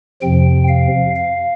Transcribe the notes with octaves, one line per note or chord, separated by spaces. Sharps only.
F2 C3 F3 G5
F5
F5